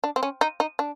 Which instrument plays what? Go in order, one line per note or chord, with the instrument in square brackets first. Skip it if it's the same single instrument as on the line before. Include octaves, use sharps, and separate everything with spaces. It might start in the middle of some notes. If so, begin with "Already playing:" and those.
[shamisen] D4
C4
C#4
D#4
D#4
D4